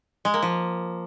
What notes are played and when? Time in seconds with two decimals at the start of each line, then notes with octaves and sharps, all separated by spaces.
0.25 G#3
0.34 A#3
0.43 F3